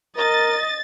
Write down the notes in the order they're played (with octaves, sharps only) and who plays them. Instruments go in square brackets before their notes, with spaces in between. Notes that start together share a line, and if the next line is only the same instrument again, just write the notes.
[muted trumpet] A#4 [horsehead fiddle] D#5 [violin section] A6